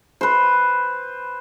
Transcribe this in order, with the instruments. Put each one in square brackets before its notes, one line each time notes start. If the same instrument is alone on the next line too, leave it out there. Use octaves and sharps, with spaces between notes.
[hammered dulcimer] B4 C5